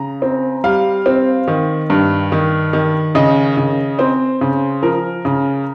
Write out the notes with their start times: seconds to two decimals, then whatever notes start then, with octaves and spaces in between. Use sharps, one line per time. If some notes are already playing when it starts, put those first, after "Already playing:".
Already playing: C#3 A#5
0.22 C4
0.64 G3 F5
1.06 C4
1.48 D#3
1.90 G2
2.32 D#3
2.73 D#3
3.15 C#3 D#5
3.57 C#3
3.99 C4 C5
4.41 C#3
4.83 F3 A#4
5.25 C#3